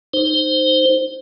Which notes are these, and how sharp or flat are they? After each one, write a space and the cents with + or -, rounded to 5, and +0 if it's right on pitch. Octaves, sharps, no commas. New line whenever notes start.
D#4 -10 C5 +0